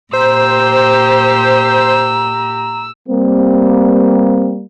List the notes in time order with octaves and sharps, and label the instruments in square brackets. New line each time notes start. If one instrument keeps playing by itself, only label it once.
[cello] A#2 G4 [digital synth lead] C5 [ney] A#5 [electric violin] E6
[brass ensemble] G3 A#3 [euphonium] C4